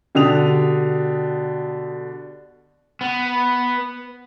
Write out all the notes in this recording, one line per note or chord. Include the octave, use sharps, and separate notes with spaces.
B2 D3 G4 D#6 F7
B3